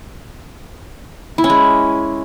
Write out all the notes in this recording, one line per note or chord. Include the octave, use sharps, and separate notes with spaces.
E4
C#4
G#3